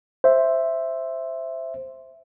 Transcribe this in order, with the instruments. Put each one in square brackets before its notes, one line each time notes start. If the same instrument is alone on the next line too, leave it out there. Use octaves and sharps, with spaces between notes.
[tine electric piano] C5 E5